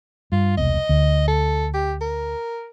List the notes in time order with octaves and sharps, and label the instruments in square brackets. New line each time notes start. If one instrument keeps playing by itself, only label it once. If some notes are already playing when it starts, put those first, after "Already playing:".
[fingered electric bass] G2 [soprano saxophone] F4
[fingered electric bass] E1 C2 [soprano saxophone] D#5
[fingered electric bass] D2
[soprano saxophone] A4
G4
A#4